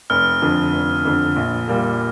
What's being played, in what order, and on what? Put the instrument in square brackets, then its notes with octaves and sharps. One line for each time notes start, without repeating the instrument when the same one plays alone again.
[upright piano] F1 [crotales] F6
[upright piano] F2 D3
F1
F2 D3
A#1
A#2 G3 A#3